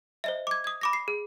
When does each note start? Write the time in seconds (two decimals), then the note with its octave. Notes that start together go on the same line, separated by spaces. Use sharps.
0.24 C5 D#5 E5
0.47 D6 G#6
0.64 D#6 G#6
0.81 B5 D6 A#6
0.93 C7
1.08 G#4